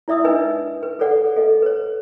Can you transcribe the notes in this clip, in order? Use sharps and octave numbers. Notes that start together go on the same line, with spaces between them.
E4 D5 E5 D#6 E6
D4 D#4 B4 D#5 E6
B4
G#4 A4 C#5 D5 F#5
A4 D#5
B4 C#5